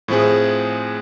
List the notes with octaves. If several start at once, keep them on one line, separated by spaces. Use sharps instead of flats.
A2 F3 C4 G#4